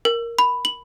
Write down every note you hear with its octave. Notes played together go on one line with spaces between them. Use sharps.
A#4
B5
F#7